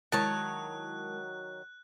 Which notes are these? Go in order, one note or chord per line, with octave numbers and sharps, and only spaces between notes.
D#3 F#3 G#3 E4 A#4 C#5 A5 F#6